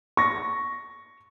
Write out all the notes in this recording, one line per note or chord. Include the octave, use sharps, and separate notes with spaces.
C#6 A#6